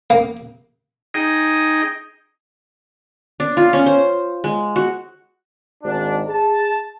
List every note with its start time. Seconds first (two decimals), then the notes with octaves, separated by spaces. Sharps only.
0.10 A#3
1.14 D#4 G#4 D#5 G5
3.40 D4
3.57 F4
3.73 C#4
3.86 C5
4.44 G#3
4.76 F#4
5.83 G#1 G#2 D4
6.26 G#4 A5